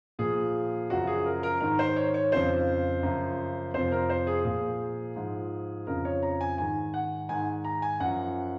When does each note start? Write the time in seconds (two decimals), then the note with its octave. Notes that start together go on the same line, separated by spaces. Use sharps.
0.19 A#2 F3 G#4
0.90 F#2 C#3 F3 F#4
1.07 G#4
1.26 A#4
1.43 A#4
1.61 G#2 D#3 A#4
1.79 C5
1.97 C#5
2.14 C#5
2.32 F2 C#3 F3 C5
3.03 F#2 C#3 F3
3.74 F2 C3 F3 C5
3.92 A#4
4.10 C5
4.27 G#4
4.45 A#2 F3 G#4
5.16 G#2 F3
5.87 F2 C#3 F3 A#4
6.05 C#5
6.22 A#5
6.41 G#5
6.58 G#2 D#3 G#5
6.94 F#5
7.29 G#2 D#3 G#5
7.65 A#5
7.82 G#5
8.00 F#2 F3 F#5